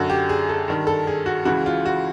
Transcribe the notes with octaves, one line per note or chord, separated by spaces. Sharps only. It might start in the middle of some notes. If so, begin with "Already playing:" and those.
Already playing: F#2 D3 F#4
G4
G#4
A4
G2 D#3
A4
G#4
F#4
C#2 C#3 E3 F#4
F4
F#4